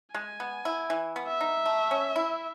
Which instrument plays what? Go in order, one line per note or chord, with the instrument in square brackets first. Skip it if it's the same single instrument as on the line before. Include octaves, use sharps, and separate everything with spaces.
[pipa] G#3 [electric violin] G#5
[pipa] B3
E4
E3
B3
[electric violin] E5
[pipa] D#4
A3
C#4
E4